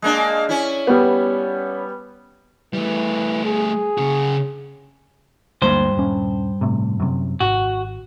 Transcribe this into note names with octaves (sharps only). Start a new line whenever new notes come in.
G#3 A#3 D4
C#4 E4
G3 B3
E3 G3 A3
G#4
C#3 F#4
D2 G2 G#3 A#3 C5
D#1 C#4
A2 C3
F#2 C3
G#1 F#4